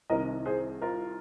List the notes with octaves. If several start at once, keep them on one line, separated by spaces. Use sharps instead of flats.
C2 C3 D#3 A#4 D#5
G#4 C5
F4 A#4